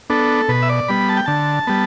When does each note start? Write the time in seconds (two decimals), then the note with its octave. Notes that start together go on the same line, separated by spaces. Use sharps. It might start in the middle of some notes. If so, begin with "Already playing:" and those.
0.10 B3 D4 A4
0.49 B2 B4
0.62 E5
0.69 D5
0.88 G3 B3 B5
1.09 A5
1.17 G5
1.26 D3 A5
1.67 G3 B3